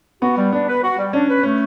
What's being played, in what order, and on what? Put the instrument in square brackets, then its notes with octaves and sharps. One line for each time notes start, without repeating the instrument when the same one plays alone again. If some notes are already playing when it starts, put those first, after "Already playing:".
[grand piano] B3 [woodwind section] F#4
[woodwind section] G3
[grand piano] B3 [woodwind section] D4
[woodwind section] B4
F#4
G3
[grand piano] C#4 [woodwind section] D4
[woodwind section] B4
[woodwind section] A3 [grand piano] C#4